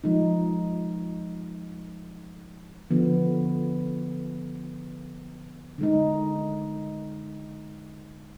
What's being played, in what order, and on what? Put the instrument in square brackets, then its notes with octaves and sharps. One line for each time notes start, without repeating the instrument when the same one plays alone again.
[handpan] F3 G#3 D#4
D3 F3 B3
D3 G#3 D#4